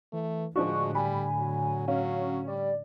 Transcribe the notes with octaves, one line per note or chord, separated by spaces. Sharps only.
E3 A3
A2 D3 F3 G#3 D4 F#4 C#6
G3 G#5 B5
F#3
F#3 C#4 F5
G3 D5